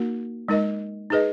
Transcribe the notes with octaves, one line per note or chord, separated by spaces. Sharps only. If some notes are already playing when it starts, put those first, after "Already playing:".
Already playing: A#3 D#4 F#4 A#4
G#3 D#4 A#4 D#5
D#4 G#4 B4 D#5